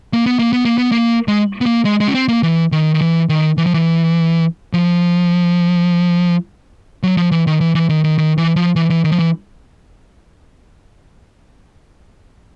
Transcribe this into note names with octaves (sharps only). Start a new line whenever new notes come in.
A#3
B3
A#3
B3
A#3
B3
A#3
G#3
B3
A#3
G#3
G#3
C#4
C4
A#3
E3
D#3
D#3
E3
D#3
E3
F3
E3
F3
F#3
F3
E3
D#3
E3
E3
D#3
D#3
D#3
E3
F3
E3
E3
D#3
F3
E3